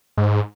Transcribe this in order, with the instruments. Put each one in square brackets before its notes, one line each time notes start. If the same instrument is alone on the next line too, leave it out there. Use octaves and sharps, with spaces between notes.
[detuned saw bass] G#2